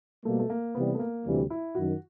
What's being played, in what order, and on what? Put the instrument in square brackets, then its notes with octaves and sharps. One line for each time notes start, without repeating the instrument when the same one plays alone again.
[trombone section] B2 G3 A#3 [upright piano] A3
[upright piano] A3
A#3
[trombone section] C3 E3 G3 [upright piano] B3
[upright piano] A3
A#3
[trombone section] D2 C3 E3 G3
[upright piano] E4
[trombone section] F#2 D#3 [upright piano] F#4